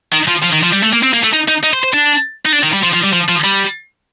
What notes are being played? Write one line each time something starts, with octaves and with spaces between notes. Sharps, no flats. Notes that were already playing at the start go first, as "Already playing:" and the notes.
D#3
F3
F3
D#3
F3
G3
A3
A#3
C4
A#3
A3
D#4
D#4
D#4
C5
C5
D4
D#4
D4
D#3
G3
F3
F3
G3
F3
F3
G3